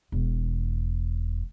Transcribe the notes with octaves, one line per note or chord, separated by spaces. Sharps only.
E1 E2